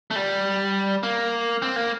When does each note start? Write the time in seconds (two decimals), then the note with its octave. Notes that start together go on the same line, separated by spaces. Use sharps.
0.11 A3
0.16 G3
1.03 A#3
1.62 C4
1.76 A#3